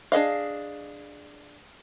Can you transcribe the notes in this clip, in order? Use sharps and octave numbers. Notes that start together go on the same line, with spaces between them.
D4 G#4 D#5 F5